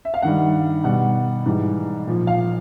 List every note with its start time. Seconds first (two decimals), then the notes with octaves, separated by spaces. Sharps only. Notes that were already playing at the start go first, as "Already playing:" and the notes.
0.05 E5
0.14 F5
0.22 G2 D#3 G3 F#5
0.84 B2 G3 F#5
1.45 G#2 E3 G3
2.07 A#2 F3
2.27 F5